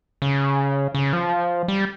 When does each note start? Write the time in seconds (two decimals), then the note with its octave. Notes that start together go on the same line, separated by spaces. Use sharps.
0.22 C#3
0.95 C#3
1.13 F3
1.68 G3